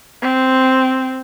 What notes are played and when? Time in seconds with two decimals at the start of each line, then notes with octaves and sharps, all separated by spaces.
0.22 C4